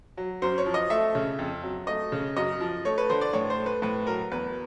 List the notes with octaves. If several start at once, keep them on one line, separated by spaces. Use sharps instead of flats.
F#3
F#2 C5
C#5
F3
D#5
A3 E5
C#3
F2
F#3
A3 D#5
C#3
F#2 D#5
F3
A3 C#5
B4
D3 C5
D5
A2 C#5
C5
A3
B4
A2 B4
F#3 A#4
E2 B4